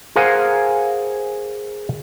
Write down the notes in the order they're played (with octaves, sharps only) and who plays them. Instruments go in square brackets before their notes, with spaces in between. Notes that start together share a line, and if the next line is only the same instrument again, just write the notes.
[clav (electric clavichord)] G#4 A#4 C5 F5 F#5 G#5